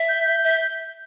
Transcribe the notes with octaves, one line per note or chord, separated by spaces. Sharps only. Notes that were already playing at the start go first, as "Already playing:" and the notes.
Already playing: E5
G6
G6
E5